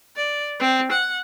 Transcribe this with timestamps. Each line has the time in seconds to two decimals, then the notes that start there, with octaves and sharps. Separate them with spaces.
0.16 D5
0.60 C4
0.92 F#5